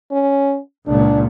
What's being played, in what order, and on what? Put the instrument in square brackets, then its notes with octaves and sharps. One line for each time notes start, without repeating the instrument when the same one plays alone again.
[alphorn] C#4
[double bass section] C#2 A#2 [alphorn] D4